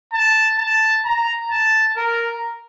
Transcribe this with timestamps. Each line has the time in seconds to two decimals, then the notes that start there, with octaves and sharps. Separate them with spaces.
0.13 A5
0.59 A5
1.05 A#5
1.51 A5
1.96 A#4